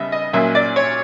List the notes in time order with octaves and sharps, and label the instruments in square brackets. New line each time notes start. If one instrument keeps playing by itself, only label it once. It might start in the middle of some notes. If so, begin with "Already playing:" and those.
Already playing: [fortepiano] C#3 G3 B3 D#5 E5
D#5
A#2 F#3 A#3 C#4 E5
D5
C#5